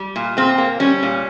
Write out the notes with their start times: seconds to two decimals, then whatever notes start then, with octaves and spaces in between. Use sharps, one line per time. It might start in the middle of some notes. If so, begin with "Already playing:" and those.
Already playing: G3
0.16 A#2
0.37 A#2 C4
0.58 A#3
0.80 G3 C#4
1.03 A#2